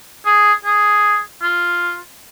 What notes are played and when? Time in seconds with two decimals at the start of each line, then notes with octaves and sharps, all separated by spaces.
0.26 G#4
0.64 G#4
1.42 F4